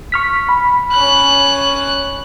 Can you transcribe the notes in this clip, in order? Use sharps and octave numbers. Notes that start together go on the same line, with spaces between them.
C#6 F6 B6
B5
C#4 F#6